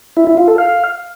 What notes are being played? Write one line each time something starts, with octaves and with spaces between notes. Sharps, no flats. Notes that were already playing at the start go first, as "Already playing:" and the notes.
E4
E4
F4
A4
F5